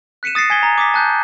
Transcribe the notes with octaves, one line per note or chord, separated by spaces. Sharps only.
F#6 B6 C#7 D#7 E7
D#6 A6 A#6 C7 C#7
G#5 G#6 B6 G7
A#5
D6 D#6 B6
A5 F#6 G6